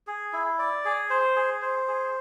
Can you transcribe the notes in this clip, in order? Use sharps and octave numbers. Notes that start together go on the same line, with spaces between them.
G#4
E4
D5
G#4
C5
G#4
C5
G#4